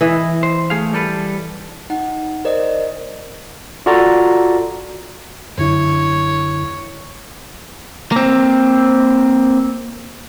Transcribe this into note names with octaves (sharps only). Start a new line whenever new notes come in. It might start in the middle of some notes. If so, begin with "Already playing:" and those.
E3 D#5
C5
A3 G#4 F5
G3 A4 B4
D#4 F#5
A#4 C5 D5 D#5
F4 F#4 A4 D5 F5 A#5
F#2 D3 E4 C#5
A#3 C4